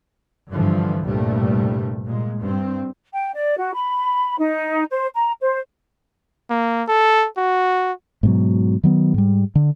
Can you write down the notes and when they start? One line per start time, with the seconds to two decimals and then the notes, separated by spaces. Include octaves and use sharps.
0.51 G2 D3 E3 F3
1.04 C2 G2 A#2 G3 A3
2.06 A#2 G#3
2.39 G2 C4
3.13 G5
3.34 D5
3.58 F#4
3.74 B5
4.38 D#4
4.91 C5
5.15 A#5
5.40 C5
6.50 A#3
6.88 A4
7.38 F#4
8.23 G#2 B2 F#3
8.84 D#3 F#3 B3
9.14 G#2 G3
9.55 D3